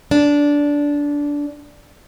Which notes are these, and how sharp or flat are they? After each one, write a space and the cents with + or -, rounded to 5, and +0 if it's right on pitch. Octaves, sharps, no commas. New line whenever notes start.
D4 -15